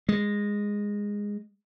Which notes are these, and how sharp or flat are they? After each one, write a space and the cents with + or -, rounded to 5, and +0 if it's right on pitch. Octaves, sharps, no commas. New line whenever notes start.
G#3 -15